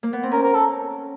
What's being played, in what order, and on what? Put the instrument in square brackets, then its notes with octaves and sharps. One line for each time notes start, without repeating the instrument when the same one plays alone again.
[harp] A#3
B3
C4
[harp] C#4 [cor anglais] A#4
[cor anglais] A#4
A4